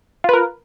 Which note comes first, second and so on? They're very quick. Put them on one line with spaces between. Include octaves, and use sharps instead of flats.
F4 B4 A#4